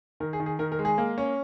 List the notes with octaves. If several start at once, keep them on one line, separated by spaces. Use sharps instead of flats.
D#3 A#4
G#4
D#3
G#4
D#3 A#4
A#4
G#3
G#4
A#3
C#4